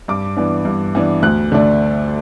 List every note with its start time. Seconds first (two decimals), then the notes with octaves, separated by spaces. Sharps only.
0.08 G2 D6
0.37 E3 B3 D4
0.65 G2
0.95 E3 B3 D4
1.22 D2 F#6
1.52 D3 A3 D4